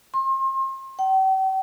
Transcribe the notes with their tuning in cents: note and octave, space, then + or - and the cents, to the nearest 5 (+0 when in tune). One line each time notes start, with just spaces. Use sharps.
C6 +35
G5 -45